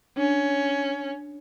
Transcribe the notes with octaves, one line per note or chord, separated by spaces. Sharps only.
C#4 D4